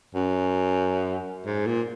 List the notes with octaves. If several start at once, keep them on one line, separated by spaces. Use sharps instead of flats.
F#2
G#2
A#2